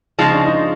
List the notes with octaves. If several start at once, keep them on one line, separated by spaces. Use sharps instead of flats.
C#3 F3 G#3 D#4
D4
D#4